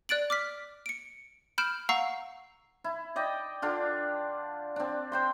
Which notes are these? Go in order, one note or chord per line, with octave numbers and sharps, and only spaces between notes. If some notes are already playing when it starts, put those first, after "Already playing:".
D5 F#6 A6 D7 F#7
D6 F6 B6
C#7 D7
B5 F6 G6 D7 E7
F5 F#5 A#5 C#6 E6 C7
E4
D5 D#5 G5
D3 D4 F4
C4 D4
C5 G5 C6